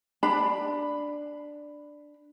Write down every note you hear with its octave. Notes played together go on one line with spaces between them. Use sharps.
D4 B5